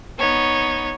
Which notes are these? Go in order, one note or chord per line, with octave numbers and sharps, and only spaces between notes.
B3 D#4 C#5